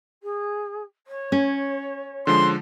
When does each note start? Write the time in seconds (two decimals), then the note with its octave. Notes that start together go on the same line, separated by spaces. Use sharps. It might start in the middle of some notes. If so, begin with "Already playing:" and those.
0.23 G#4
1.07 C#5
1.32 C#4
2.27 D3 F3 G#3 C6